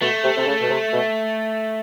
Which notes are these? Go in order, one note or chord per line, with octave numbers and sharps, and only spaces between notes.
B2 A3
C3
C3
C#3
B2
C3
B2